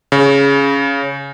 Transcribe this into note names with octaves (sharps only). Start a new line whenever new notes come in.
C#3